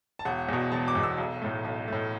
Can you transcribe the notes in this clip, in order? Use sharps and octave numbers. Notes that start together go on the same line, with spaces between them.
A5
E1 F#5
E2 B2
E1 A5
D6
E2 B2
E6
B1
A2 A3
B1
A2 A3